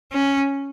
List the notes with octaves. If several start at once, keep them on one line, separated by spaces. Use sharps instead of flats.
C#4